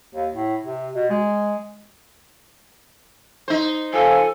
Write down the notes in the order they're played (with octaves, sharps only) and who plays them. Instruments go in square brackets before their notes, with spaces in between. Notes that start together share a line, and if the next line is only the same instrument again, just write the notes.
[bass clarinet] D#2
A2
C3
B2
G#3
[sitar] D#4 C5
[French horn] F3 [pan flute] A4 [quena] G#5